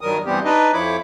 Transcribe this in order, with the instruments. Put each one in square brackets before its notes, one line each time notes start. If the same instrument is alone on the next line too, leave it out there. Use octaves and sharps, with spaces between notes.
[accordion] G2 D#3 F#3 G3 A#4 D#6
G2 E3 G3 B3 C4 G4
D4 D#4 B4 D#5
F2 F3 E4 C#5 B5 D6